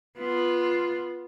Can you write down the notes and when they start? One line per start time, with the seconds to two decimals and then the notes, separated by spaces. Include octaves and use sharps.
0.18 B3 F4